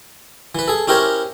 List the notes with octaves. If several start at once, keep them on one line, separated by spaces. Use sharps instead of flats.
E3 B4
G#4 A4
C#4 E4 G4 A#4 C5 C#5